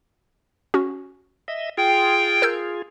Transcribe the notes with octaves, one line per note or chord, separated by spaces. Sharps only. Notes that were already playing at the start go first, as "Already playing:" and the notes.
C#4 F#4
D#5 E5
F4 G#4 G5
A#4 E6 G6